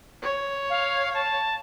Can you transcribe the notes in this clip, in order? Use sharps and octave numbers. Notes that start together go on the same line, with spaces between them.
C#5
F5
A5